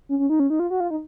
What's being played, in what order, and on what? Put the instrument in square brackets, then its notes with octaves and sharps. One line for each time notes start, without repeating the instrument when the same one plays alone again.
[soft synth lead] C#4
C#4
D#4
C#4
D#4
F4
F#4
F4
D#4